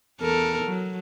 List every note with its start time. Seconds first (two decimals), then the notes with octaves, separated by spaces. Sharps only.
0.21 E2 A4 A#4
0.65 F#3